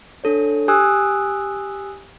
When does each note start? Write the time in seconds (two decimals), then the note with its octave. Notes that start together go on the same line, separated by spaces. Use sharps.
0.24 D4 A4 C#5
0.68 G4 G#5 D#6 E6 F#6